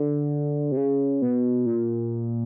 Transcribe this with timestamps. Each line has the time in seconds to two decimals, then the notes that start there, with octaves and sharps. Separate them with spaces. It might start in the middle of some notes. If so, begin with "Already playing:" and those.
Already playing: D3
0.72 C3
0.77 C#3
1.22 B2
1.66 A#2